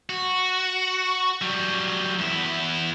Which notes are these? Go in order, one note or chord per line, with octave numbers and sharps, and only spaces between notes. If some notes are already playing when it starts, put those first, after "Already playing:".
F#4
F#3 G3
E2 E4